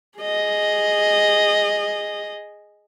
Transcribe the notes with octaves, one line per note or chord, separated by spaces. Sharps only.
G#4 D#5